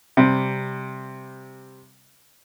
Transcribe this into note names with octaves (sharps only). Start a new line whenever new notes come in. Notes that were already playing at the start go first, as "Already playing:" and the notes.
C3 G3